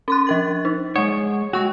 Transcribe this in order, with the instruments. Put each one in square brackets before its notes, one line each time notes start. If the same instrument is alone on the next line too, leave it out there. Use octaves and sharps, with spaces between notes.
[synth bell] C#4 C6 F#6
F3 A#4 A6
D#4
[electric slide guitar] G#3 C#5 [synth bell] F#5
[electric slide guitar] G#3 F#4 [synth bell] G5 C#6